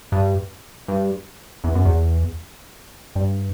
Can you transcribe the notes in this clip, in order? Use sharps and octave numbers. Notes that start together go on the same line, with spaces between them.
G2
G2
E2
F#2
E2
G2